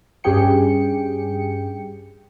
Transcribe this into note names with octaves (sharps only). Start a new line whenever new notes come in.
G2 C#4 G4 G#4 G5 C#7